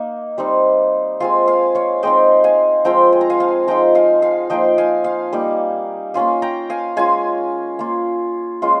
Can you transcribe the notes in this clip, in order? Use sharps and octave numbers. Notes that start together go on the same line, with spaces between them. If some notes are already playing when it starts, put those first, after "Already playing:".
Already playing: A#3 D#4
G3 C4 D#4
G#3 C4 F4 F5 G#5
F5 G#5
C#5 F5
G#3 C4 D#4 D#5 G5
F5 G#5
F3 G#3 C4 F4 G5 A#5
G#5
A#5
F5 G#5
F5 G#5
F3 G#3 D#4 G5 A#5
F5 G#5
F5 G#5
F3 A#3 D#4 D#5 G5
F5 G#5
F5 G#5
G3 A#3 D#4
A#3 C#4 F4 F5 G#5
G5 A#5
F5 G#5
G#3 C#4 F4 F5 G#5
A#3 F4
G#3 C#4 F4